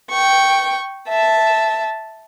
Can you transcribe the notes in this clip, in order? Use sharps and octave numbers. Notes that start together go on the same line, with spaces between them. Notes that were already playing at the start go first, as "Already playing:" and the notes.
G5 C#6
E5 A5